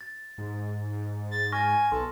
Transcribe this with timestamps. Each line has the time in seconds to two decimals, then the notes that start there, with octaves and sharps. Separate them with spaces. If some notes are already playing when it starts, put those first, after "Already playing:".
0.01 A6
0.38 G#2
1.31 A6
1.52 G#5 C#6 F6 A#6
1.92 B1 A4 C6